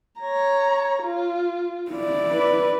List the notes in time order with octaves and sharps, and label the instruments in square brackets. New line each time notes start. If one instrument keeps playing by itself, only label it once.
[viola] C#5 A#5
F4
[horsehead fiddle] E4 D5
[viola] B4